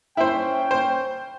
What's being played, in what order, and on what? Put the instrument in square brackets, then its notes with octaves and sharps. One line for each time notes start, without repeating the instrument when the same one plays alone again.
[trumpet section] C#4 G5 [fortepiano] E4 C5
[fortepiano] C5